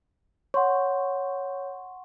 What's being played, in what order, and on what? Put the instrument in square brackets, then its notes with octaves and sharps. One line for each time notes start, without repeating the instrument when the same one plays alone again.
[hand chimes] C#5 [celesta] F#5 C6 C#6